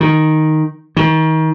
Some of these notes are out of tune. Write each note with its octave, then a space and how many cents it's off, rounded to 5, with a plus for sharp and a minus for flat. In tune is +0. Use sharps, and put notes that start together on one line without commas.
D#3 +0
D#3 +30